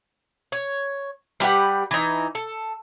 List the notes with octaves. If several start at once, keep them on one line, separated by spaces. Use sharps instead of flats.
C#5
G3 G4 B4 F#5
E3 D#4
A4